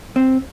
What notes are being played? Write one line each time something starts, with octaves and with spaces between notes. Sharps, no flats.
C4